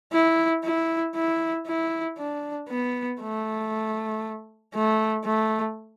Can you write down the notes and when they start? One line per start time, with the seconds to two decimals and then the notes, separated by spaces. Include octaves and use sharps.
0.13 E4
0.64 E4
1.15 E4
1.67 E4
2.18 D4
2.69 B3
3.21 A3
4.75 A3
5.26 A3